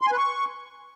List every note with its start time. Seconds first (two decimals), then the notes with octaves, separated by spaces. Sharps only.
0.02 C6
0.07 G#5
0.12 B4
0.17 C#6